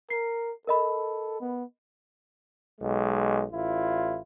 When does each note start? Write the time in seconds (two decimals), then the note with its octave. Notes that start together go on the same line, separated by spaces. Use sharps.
0.10 A#4 C7
0.67 A4 A#4 D#5 B5
1.41 B3
2.80 B1 G#3
3.51 A1 E4 F4